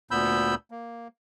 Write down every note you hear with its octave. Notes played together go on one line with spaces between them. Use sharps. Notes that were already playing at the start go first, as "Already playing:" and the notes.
D2 A#2 B3 B5 E6 G6
A#3